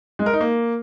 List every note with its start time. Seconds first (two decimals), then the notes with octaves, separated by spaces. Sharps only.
0.19 G#3
0.26 A#4
0.33 D#4
0.41 A#3